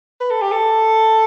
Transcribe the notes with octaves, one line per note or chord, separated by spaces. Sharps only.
B4
A4
G4
A4